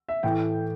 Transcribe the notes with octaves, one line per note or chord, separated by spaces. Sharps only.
E5
A2 E3 A3 G5